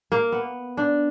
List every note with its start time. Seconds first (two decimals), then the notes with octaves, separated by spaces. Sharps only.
0.12 A#3
0.32 B3
0.77 D4